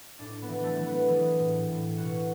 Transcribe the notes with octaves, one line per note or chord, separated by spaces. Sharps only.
A2 D4
B3
E3
A3
E3
B3
E3 G#4
A2
A2
B2 F#4